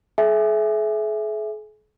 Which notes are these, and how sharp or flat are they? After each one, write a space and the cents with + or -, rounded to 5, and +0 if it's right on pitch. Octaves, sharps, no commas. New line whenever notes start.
G#4 +45 E5 +0 G#5 +0